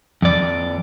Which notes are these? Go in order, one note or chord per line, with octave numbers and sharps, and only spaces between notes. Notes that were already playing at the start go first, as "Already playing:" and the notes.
F2 D5